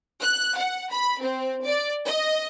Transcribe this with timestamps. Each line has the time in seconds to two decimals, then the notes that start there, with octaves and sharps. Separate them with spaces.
0.22 F#6
0.57 F#5
0.91 B5
1.23 C4
1.65 D5
2.06 D#5